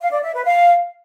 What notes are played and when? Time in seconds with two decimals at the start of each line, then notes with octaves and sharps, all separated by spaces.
0.01 F5
0.12 D5
0.23 E5
0.34 B4
0.45 F5